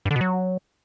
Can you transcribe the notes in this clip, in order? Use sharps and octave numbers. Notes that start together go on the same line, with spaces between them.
G2
D3
B2
F#3